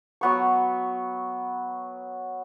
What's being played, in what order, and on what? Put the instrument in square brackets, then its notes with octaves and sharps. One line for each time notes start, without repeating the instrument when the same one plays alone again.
[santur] F#3 B3 C#6